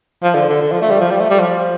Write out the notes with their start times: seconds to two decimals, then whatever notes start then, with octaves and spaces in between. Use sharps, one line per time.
0.22 F3
0.35 D3
0.49 D3
0.61 D3
0.72 F3
0.81 A3
0.90 G3
1.00 F3
1.11 G3
1.20 A3
1.30 G3
1.40 F3